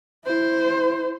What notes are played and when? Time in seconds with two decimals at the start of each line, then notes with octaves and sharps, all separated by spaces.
0.25 E4 C5